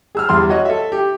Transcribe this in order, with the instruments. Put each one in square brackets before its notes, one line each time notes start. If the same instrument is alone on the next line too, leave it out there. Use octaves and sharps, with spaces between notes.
[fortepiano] G#4 E6 F6
E2 G3 C6
F#4 C#5 D#5
A4 E5
G4